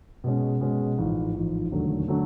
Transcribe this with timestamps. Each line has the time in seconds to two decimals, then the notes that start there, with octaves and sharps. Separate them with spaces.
0.24 B2 G#3 C#4
0.61 B2 G#3 C#4
0.98 A1 G#2 F3
1.35 A1 G#2 F3
1.72 E1 D#2 D3 F#3 A3
2.08 D3 F#3 A3